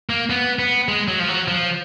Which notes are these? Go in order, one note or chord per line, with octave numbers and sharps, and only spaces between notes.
A#3
B3
B3
G#3
F#3
F3
F#3
F3